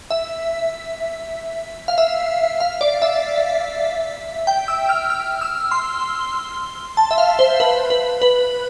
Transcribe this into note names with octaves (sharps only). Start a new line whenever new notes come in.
E5
F5
E5
F5
D5
E5
G5
E6
F6
F6
E6
C6
A5
E5
F5
C5
B4
B4
B4